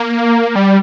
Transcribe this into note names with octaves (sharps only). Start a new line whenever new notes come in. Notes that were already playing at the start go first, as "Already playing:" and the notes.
Already playing: A#3
G3